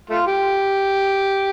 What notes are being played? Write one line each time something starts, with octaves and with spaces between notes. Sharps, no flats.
A3 F4
G4